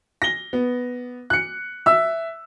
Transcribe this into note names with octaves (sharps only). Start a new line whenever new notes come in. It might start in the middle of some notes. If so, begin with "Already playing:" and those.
A#6 G7
B3
F#6 C#7
E5 E6